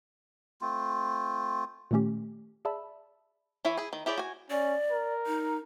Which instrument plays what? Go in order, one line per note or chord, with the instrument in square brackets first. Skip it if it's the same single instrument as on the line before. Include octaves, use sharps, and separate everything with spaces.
[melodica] A3 C4 F4
[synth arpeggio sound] A#2 D#3 A3 C#4 G4
G#4 D5 E5 A5 B5 E6
[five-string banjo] E3 E4 C#5 E5 G#5
E4 G#4
D#3
E4 G4 G#4 C#5 D5
F#4 G#5
[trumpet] C#4 [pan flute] D5
[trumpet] A#4
[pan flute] D#4